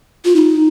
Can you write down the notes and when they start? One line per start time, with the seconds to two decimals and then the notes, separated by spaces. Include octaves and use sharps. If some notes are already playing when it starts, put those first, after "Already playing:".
0.25 F4
0.36 D#4